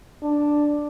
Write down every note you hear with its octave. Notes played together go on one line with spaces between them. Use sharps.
D4